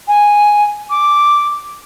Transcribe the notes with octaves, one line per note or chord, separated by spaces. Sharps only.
G#5
D6